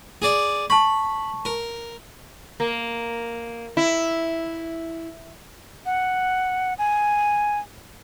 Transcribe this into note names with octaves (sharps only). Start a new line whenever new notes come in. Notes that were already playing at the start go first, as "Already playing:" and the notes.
G#4 D5
A5 B5 C#6
A#4
A#3
E4
F#5
G#5